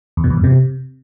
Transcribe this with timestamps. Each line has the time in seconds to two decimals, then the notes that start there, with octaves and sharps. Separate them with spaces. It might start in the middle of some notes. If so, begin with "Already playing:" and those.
0.17 E2
0.24 B2
0.30 E2
0.37 G2
0.44 C3